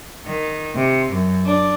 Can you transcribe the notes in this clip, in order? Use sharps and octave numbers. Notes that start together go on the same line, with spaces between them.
D#3
C3
F#2
D4